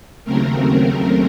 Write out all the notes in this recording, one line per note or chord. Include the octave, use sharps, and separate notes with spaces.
D#2 C#3 F#3 A3 C4 A#4